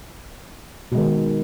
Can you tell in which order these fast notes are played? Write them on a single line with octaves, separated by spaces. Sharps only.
B2 G#3 D#3